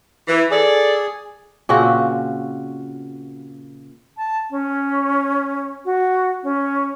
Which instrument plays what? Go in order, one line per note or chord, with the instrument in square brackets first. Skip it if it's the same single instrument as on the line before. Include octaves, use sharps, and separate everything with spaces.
[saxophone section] E3
[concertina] G#4 [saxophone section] A4 D5
[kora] A#2 C#3 C4 F#4
[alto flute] A5
C#4
F#4
C#4